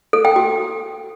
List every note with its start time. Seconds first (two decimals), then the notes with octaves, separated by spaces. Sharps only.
0.13 A4
0.25 G5
0.36 F#4